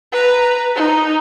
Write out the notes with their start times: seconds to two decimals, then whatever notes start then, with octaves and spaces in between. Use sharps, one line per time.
0.12 B4 A#5
0.75 D#4